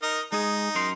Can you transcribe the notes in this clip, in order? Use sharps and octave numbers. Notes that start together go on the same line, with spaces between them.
D#4 A#4 D#5
G#3 D#4 G#4
F#2 A#4 C6